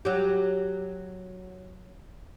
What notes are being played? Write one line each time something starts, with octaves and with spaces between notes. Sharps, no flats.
F#3 G4